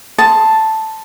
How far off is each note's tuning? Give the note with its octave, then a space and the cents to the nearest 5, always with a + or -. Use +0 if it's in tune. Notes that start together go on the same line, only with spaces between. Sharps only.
A5 +0 C6 +0 D#6 +25